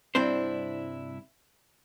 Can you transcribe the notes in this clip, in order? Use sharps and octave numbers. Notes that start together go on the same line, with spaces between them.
C2 G2 C4 D4 E4 C5